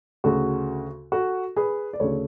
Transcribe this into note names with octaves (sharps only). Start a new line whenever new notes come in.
D2 C#3 F#4 A4
F#4 A4
G#4 B4
D5
D2 C#3 A4 C#5